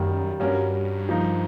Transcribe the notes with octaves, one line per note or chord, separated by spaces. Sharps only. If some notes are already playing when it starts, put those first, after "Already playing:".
Already playing: F#2 D#3 G3 A#3
G2 G3 A#3 C#4 F#4 A#4
F3 A#3 D#4